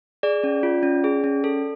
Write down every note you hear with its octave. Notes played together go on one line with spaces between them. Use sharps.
G#4 D5
C#4
F4
C#4
G#4
C#4
A4